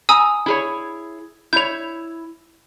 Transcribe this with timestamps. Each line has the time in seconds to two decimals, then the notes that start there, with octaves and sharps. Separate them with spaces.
0.09 G#5 A#5 D#6 E6
0.46 E4 G#4 C#5
1.53 E4 C#5 G6 F7